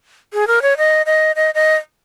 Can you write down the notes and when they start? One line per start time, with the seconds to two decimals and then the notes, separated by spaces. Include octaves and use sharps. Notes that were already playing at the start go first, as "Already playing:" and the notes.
0.33 G#4
0.48 A#4
0.62 C#5
0.78 D#5
1.06 D#5
1.36 D#5
1.55 D#5